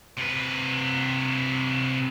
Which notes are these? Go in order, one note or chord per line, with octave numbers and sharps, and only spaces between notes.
C3 B4